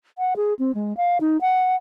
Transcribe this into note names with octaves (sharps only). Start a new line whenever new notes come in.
F#5
G#4
C4
G#3
F5
D#4
F#5